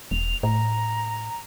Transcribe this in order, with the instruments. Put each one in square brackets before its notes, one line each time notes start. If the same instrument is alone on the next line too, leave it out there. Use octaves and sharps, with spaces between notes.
[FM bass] E1 [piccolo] F7
[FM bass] A2 [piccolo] A#5